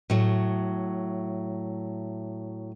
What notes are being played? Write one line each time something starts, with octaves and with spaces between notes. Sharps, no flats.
A2 F#3